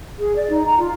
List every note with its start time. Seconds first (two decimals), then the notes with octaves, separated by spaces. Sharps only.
0.19 G#4
0.36 D5
0.49 D#4
0.66 A#5
0.78 F4